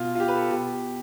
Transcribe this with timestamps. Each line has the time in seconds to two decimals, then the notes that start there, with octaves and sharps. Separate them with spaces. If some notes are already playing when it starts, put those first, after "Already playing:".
Already playing: B2 F4
0.15 F4
0.20 G4
0.28 B4
0.35 A4
0.51 B2 G4